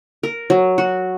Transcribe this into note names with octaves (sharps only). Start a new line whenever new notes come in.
A#4
F#3
F#4